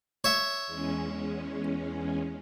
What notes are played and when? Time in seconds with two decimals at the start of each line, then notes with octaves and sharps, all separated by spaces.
0.24 C#5 E5
0.67 E2 G#3 C#4